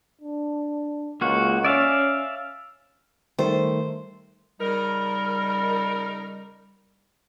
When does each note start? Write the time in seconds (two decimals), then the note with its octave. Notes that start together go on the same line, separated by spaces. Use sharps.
0.21 D4
1.21 C#2 A#3 F#4
1.64 C#4 D5 E5 F5
3.39 D#3 G3 A3 C5
4.60 C#3 G3 D#4 A#4